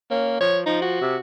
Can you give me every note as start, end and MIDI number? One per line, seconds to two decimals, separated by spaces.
0.11 0.36 58
0.11 0.36 61
0.40 0.64 53
0.40 0.59 73
0.66 1.01 53
0.66 0.81 63
0.82 1.20 66
1.01 1.16 48